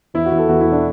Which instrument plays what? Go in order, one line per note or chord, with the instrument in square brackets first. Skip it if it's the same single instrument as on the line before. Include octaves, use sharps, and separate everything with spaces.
[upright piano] E2 E4
F#4
E2
A4
E2 F#4
E4
B2
D4